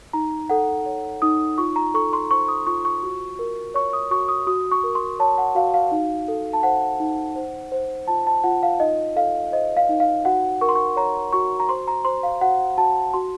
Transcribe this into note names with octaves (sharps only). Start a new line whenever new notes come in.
D#4 A#5
A4 F#5
C#5
D#4 D#6
F4 C#6
A#5
A4 C#6
C6
C5 C#6
D#6
F4 C#6
C#6
F#4
A#4
C#5 C#6
D#6
F#4 C#6
D#6
F#4 D#6
C#6
A#4
C6
C#5 A5
F#5
F#4 F5
F5
D#4
A4
A5
C5 F#5
D#4
C5
C5
F4 A5
A5
F4 F#5
F5
D#4 D#5
A4 F5
C5 D#5
F5
D#4
F5
F#4 F#5
A#4 C#6
C6
C#6
C#5 A#5
F#4 C#6
A#5
C5 C6
A#5
C5 C6
F5
F#4 F#5
F#4 A5
F#4 C6